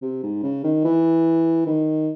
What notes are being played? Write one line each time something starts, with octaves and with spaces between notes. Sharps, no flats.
C3
G#2
C#3
D#3
E3
D#3